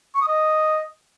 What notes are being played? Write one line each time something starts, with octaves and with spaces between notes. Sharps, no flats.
C#6
D#6
D#5